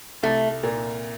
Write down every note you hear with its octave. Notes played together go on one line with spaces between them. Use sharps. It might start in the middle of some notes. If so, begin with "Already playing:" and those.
C2 A3
A#2